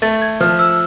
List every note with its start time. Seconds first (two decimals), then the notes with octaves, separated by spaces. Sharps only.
0.02 A3 A6
0.22 G#6
0.41 F3 F6
0.59 E6